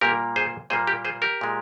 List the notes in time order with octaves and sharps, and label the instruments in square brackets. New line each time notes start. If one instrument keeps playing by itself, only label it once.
[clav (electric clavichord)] A#2 G3 A#3 G4 A#4
G#4 C5
A#2 G3 A#3 G#4 C5
G4 A#4
G#4 C5
G4 A#4
A#2 G#3